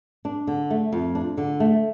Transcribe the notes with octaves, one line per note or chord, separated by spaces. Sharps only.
D4
D3
A3
F2
D4
D3
A3